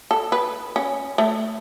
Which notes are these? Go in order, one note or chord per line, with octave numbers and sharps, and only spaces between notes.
A4
B4
C#4
A3